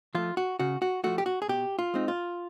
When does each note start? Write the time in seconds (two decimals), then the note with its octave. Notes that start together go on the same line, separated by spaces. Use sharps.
0.15 F3 A3 F4
0.37 F#4
0.59 C#3 F#4
0.82 F#4
1.04 F3 A3 F#4
1.18 G4
1.26 F#4
1.42 G#4
1.48 B2 G4
1.79 F4
1.94 G#3 C4 D#4
2.08 F4